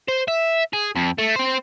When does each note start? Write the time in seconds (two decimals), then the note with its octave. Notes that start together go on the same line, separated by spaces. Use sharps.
0.08 C5
0.28 E5
0.73 G#4
0.96 F2
1.18 A3
1.36 C4 C5